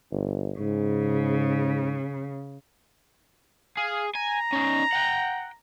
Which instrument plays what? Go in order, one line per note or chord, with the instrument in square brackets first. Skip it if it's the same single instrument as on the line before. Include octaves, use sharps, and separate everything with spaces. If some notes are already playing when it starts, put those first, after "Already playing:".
[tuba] G1
[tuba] G#2 [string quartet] C#3
[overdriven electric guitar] G#4 [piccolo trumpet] F5
[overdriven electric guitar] G#5 [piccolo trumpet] A#5
[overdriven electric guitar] C#4 D#4
F#5 G5